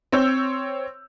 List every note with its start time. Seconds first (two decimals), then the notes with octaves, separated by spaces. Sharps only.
0.12 C4 C#5 E6 G6